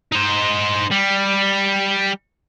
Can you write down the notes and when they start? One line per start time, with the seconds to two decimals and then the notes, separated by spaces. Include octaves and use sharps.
0.12 D#4 C5
0.91 G3